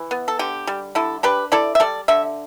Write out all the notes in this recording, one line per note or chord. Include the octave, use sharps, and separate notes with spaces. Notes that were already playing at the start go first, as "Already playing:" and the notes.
Already playing: E3
B3
A4
D3 G4
G3
D3 E4 A4
D4 G4 B4
E4 A4 D5
E5
G3 A4 D5
D3 E5